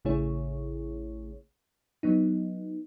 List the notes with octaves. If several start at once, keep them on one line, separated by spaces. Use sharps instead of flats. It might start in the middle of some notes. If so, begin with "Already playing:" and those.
A1 C#3 A3 E4 G#4 C#5
F#3 B3 D#4